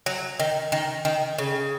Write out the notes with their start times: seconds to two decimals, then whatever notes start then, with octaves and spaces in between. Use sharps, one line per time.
0.06 F#3
0.40 D#3
0.72 D#3
1.05 D#3
1.38 C#3